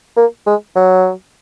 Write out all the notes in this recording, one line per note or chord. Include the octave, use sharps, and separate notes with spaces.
A#3
G#3
F#3